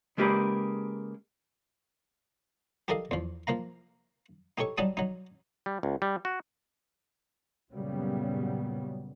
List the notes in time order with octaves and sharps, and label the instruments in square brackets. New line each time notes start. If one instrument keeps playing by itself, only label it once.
[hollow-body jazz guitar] C#3 G#3 A#3 G4 G#4 B4
[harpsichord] G4 A4 A#4 D5 D#5 F5
E2 F3
F3 A#3 F5 A#5
D#4 G4 A4 C#5 C#6
F#3 G3 D#4 D5 A5 D#6
F#3 D#4
[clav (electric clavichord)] G3
C#2
G3
F#4
[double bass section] F#2 A#2 C#3 F#3 G3 B3